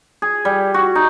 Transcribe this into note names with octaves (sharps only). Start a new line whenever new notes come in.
G#4
G3
F#4
D#4